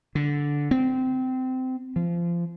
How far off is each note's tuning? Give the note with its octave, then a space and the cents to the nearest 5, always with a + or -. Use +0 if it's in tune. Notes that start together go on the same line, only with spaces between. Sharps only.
D3 -10
C4 -20
F3 -25